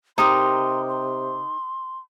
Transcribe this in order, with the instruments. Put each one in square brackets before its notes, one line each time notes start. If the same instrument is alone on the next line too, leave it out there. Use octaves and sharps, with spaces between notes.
[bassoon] C3 [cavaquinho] D#4 G4 A#4 [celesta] A#5 D#6 [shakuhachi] C6
[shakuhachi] C6